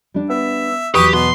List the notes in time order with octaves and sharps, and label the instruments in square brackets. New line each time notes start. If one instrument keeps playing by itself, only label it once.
[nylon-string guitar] G3 D4
[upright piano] B3 [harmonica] E5
[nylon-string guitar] E2 F#3 [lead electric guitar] G4 [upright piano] B4 [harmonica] C#6 D#6
[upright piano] B2 [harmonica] B3 [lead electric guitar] C6